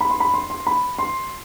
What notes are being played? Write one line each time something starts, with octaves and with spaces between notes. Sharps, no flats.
B5
C6
B5
C6
C6
B5
C6